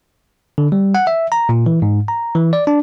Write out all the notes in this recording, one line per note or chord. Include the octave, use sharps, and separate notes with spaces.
D3
G3
F#5
E5
A#5
A#2
E3
G#2
A#5
E3
D5
D4